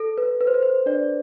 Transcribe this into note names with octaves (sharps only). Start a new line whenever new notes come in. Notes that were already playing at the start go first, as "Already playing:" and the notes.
Already playing: A4
B4
B4
C5
B4
C5
D4 D5